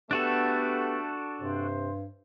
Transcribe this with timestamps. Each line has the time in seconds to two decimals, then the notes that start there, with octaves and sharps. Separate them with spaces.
0.11 A3 B3 D4 F#4 G4 A4
1.41 G2 C3 C5